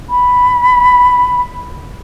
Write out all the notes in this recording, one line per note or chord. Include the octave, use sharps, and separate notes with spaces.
B5